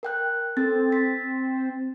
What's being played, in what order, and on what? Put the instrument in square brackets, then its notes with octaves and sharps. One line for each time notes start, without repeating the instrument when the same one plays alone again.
[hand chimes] A#4 G5 F#6
[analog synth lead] C4 [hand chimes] A4 A6
[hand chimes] A6 B6